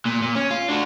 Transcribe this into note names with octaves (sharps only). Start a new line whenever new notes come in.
A#2
A#2
C#4
F4
D4 F#4